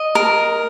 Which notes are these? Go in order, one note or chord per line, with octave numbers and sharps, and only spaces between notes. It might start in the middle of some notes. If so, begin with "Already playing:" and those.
Already playing: D#5
A#4